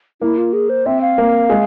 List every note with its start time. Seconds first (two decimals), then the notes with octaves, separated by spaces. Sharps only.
0.21 A#3 E4
0.38 F4
0.53 G#4
0.69 C5
0.86 C4 E5
1.01 F5
1.18 A#3
1.49 G#3